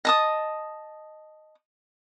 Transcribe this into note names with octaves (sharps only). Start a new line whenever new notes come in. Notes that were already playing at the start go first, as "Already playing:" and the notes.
D#5 A5 D#6